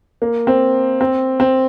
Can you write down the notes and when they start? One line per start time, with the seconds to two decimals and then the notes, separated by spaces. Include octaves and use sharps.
0.22 A#3
0.47 C4
1.01 C4
1.40 C4